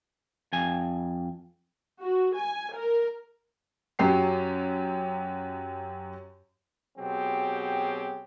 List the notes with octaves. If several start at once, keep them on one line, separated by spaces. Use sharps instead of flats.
F2 G#5
F#4
G#5
A#4
F#2 F#3 G4 C7
B2 F#3 C4 G4 G#4